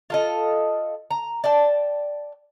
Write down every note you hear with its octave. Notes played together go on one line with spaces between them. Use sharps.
F4 A4 D#5
A#5
D5 G5 A5